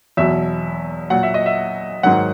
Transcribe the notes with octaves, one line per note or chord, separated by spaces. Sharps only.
E2 B2 F#3 E5
A#2 F#3 F#5
E5
D#5
E5
G#2 D#3 F#3 F#5